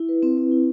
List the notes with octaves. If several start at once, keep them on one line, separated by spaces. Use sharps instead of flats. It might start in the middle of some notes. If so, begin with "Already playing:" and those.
Already playing: E4
B4
C4
C4
E4